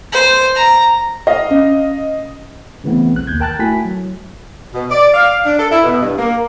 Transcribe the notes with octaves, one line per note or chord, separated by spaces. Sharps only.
C5
A#5
D#5 F5
C#4
C#3 E3 A3 B3 C4
B1 F#6
D#2 G6 G#6
A#4 G5 A5 F#6 A6
A3 E4 F#4 G#5 B6
F#3
B2
D5
F5
D4
A4
E4
B2
G2
A#3